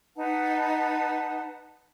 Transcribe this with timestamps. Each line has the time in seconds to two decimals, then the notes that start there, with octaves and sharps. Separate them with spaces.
0.17 D#4 B4 F#5 A5